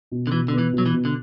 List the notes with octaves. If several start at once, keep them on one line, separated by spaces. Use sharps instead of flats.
B2
D3
B2 E3
D3 B3
E3
B2
F#3
E3
B2
D3